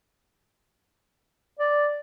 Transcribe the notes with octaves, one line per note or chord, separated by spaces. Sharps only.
D5